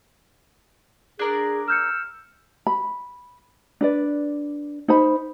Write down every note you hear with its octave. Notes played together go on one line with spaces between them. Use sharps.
D4 G#4 A#4 D5
E6 F6 G6 C#7
B5
D4 B4 D5
D#4 C5 B5